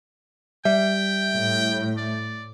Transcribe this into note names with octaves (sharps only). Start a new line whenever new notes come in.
G3 E5 G5
A2
D5